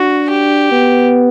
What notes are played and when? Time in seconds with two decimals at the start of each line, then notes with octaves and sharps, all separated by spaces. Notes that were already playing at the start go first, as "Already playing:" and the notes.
Already playing: D4 F#4
0.30 G4
0.72 B3